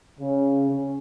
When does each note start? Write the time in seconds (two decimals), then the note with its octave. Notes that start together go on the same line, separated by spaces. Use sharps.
0.20 C#3
0.70 C#4